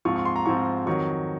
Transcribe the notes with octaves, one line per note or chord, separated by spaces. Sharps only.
G#2 F3 C4 F4 C#6
C#6
C6
A#5
G#2 F3 C4 F4 C#6
F2 D#3 F#3 C#6